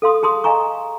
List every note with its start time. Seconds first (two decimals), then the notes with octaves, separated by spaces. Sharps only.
0.02 A4 F5 C6 D#6
0.23 G#4 A5 C6 D#6
0.44 D#5 F5 G#5 A#5 C#6